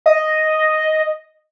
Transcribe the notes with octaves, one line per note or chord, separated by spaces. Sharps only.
D#5